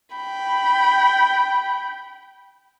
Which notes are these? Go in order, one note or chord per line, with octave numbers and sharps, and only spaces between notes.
G5 B5